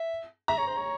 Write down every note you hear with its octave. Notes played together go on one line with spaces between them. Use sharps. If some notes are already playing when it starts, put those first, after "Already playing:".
Already playing: E5
E5 A#5
C#5
C5
C#5